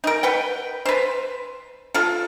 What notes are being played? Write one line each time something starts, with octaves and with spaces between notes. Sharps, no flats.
D#4 A#4
B4 F#5 G5
B4 C5
F4 A4